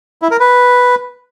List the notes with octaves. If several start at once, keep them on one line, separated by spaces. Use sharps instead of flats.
E4
A#4
B4